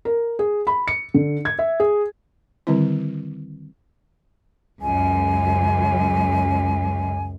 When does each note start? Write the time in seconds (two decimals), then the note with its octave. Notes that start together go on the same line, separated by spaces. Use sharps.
0.05 A#4
0.39 G#4
0.67 B5
0.88 C#7
1.14 D3
1.45 G#6
1.59 E5
1.80 G#4
2.67 D3 D#3 G3 C4 E4
4.82 C#2 F#2 G#5